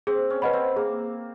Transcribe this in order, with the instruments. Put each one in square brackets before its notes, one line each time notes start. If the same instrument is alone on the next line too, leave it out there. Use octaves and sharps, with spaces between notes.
[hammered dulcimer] C4 [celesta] G#4
[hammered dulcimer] C#4
[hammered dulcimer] C#4 [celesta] B4 D#5 F#5 B5
[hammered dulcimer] C4
[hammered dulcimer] A#3 [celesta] G#4